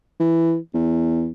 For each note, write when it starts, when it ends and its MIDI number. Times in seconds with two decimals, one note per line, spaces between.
0.20 0.57 52
0.74 1.30 40